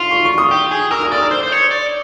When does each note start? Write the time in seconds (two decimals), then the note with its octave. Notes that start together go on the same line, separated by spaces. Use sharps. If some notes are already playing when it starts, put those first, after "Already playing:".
Already playing: F4 C6
0.11 C#6
0.25 C#6
0.38 D#6
0.51 G4
0.71 G#4
0.91 A#4 E6
1.01 D#6
1.12 D5 D#6
1.22 E6
1.31 C5
1.43 C5
1.52 C#5
1.71 D5